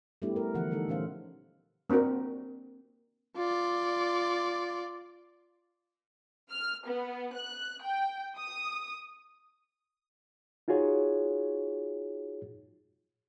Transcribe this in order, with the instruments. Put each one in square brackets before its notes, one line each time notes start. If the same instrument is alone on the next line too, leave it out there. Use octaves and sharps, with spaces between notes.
[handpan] G3 A3 B3 D4 E4 G4
A#4
D3 E3 F3 B3 F#5
G3 A3 D#4 A4
A#2 E3 C#4 A#4 C5 F5
[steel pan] A#3 C4 D4 F#4 A#4
[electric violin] F4 D5
[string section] F6
B3
F#6
G5
D#6
[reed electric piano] D#4 F4 F#4 G#4 C#5